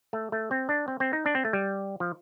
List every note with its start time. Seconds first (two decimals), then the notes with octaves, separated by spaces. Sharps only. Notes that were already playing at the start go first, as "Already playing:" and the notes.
0.13 A3
0.32 A3
0.51 C4
0.69 D4
0.88 C4
1.00 C4
1.13 D#4
1.26 D4
1.35 C4
1.45 A3
1.53 G3
2.00 F3